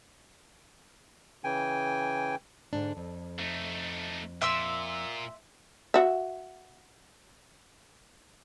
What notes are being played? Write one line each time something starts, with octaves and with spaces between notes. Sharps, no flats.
C#3 E3 G5 G#5
G#2 D3 D4
F2
A3 D#4
A#2 E5 C6 E6
F#4 E5